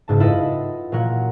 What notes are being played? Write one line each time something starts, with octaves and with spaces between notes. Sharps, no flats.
F#1 G#2 A5
E4 F4 A4 B4 D#5 F#5
A#2 F#3 A#4 F#5